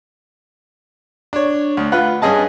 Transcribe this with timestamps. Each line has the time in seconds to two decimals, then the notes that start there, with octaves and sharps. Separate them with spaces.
1.33 D4 C#5
1.77 D2
1.92 F4 B4 F#5 F#6
2.22 G2 C#4 G#4 D#5 A5